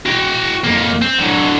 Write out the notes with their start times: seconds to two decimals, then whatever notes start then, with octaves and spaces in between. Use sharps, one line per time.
0.06 F#4 G5
0.64 F2 A#3
1.02 C4
1.18 D3 F#3